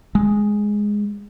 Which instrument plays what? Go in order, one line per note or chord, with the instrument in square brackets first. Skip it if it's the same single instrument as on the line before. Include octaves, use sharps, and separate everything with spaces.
[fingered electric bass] G#3